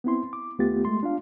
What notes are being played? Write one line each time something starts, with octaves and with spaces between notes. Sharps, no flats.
B3 C4 E4 C6
D6
D#2 A3 B3 F4 G4 A6
G#3 A3 C6
D4 F4 F5